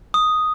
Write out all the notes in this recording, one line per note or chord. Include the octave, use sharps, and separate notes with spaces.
D#6